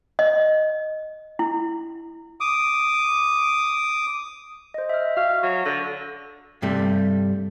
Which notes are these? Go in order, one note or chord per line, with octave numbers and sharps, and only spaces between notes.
D#5
E4
D6 D#6
C5 D#5
E5 F6
F#4 F5
F#3 C#6
D3 A#6
G2 C3 G3 A3